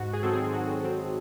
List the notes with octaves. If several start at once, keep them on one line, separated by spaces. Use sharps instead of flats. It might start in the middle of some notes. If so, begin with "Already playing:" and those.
Already playing: G#2 F#4
G#4
D#3 F#3 C4 A4
G#4
G#2 F#4
D#3 F#3 C4